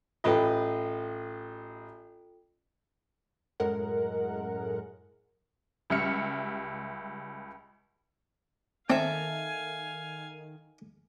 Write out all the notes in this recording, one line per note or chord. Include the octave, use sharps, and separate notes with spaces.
A1 F4 A4 B4 D#5 G5
F#2 A2 G#3 A#4 F#5
C#2 G3 E5 F6 C#7
D#3 C4 A4 E5 F5 G#5